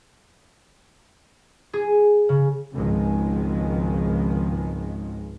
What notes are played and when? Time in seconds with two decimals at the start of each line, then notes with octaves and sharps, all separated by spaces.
1.73 G#4
2.29 C#3
2.73 G#1 C#2 G#2 D#3 F3 G#3